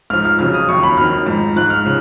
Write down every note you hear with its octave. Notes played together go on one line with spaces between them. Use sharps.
G#2 F3 F6
F6
F2 C#3 F#3 F6
D#6
D#2 D#3 F#3 C#6
B5
F2 D#3 F#3 F6
G#2 F3
G#2 F3 F#6
F6
C#3 F3